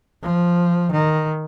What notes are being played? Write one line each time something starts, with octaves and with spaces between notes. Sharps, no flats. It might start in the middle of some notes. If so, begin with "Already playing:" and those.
F3
D#3